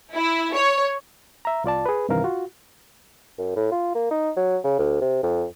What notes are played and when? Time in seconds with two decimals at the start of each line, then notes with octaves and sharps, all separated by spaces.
0.15 E4
0.54 C#5
1.45 E5 A#5
1.64 C2 F4 D5 A5
1.86 G#4 B4
2.09 G2 C3 D#3 E3 A#4 F5
2.24 F4 F#4
3.38 F#2
3.56 A2
3.72 F4
3.95 A#3
4.11 D#4
4.37 F#3
4.64 C#3
4.79 D2
5.01 C3
5.23 F2